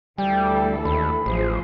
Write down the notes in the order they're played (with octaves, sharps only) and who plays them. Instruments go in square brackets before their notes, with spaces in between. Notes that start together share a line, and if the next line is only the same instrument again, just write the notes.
[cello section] D2 E3 A4 [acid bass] G3 [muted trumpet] G5
[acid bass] D#2 [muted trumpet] B5
[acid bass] A1 [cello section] F3 G#4 C5